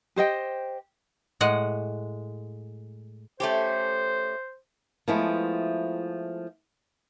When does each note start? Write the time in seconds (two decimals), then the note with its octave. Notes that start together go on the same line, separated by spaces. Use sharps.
0.16 G4 C5 D#5 G5
1.41 A2 G#3 F#5
3.40 A3 C#4 G4 C5
5.08 F3 G#3 A3 B3 E4 F4